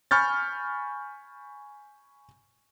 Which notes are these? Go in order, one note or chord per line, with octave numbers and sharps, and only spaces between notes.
G#5 B5 C#6 F6 G6 A6